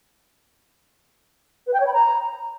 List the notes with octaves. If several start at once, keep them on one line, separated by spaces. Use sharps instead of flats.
B4
G5
C#5
B5
A#5